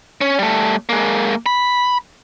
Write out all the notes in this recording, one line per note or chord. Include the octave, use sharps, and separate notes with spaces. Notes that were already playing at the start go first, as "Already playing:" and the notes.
C#4
G3 A3
G#3 A#3
B5